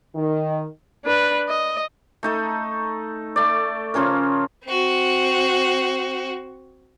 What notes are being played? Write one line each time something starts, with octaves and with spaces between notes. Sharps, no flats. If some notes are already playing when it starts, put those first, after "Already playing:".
D#3
D4 B4
D#5
A3 D#4 A4
A3 D5
C#3 F3 C#4 A#4
C4 F#4